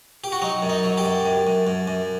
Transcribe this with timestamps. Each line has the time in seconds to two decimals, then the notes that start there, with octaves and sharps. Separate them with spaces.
0.24 G4
0.32 F#4
0.42 F#3 D#4
0.62 F#2
0.70 D#4
0.83 F#3
0.98 G4
1.04 F#2
1.25 F#2
1.47 F#2
1.67 F#2
1.88 F#2